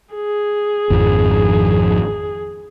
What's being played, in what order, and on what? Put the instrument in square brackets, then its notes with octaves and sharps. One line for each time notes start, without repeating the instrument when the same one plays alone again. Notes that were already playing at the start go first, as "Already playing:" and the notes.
[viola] G#4
[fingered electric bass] G#1 F2 F3